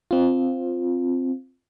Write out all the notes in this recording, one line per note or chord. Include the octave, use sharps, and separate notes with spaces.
C4 F4